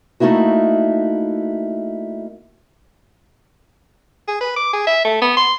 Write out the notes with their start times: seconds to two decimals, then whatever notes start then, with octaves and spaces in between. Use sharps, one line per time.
0.20 A3 A#3 D#4 E4 F#4
4.28 G#4
4.41 B4
4.56 D6
4.73 G#4
4.87 E5
5.05 A3
5.21 B3
5.37 C6